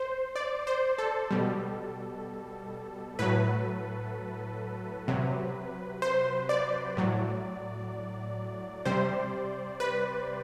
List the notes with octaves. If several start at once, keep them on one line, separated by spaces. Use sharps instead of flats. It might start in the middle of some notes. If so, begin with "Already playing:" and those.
Already playing: C5
D5
C5
A4
B2 G3
A2 F#3 B4
C3 F#3
C5
D5
A2 F#3
C3 G3 C5
B4